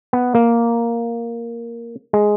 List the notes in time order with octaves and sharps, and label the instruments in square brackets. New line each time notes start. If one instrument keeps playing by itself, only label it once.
[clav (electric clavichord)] B3
A#3
G#3